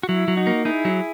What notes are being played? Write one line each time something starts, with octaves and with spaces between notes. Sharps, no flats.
F#4
F#3 E4
F#3
D#4 F#4
A#3
D#4 E4 G#4
F#3